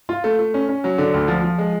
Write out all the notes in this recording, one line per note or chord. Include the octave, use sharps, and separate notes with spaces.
F4
A3
A3
C#4
C#4
F#3
D3
D2
F3
F3
G#3